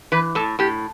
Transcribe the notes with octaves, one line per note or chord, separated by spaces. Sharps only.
E3 B4
A2 A4
A2 G4